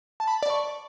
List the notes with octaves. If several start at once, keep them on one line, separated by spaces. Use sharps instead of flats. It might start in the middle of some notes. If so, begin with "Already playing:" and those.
A5
B5
A5
D5
C#6